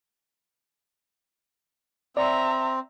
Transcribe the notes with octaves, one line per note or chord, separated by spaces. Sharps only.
C4 D5 E5 A#5